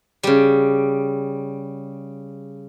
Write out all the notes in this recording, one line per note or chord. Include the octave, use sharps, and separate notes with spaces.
C#3 G3